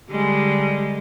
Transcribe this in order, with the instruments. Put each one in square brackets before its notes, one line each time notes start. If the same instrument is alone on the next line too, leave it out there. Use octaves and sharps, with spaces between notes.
[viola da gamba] D3 G3 G#3